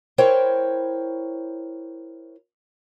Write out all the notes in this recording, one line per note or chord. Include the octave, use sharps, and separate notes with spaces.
E4 A#4 C5 C#5 G5